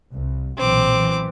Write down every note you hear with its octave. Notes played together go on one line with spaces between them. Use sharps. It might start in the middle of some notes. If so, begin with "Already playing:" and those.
C2
B1 A#2 E3 C4 D6
E3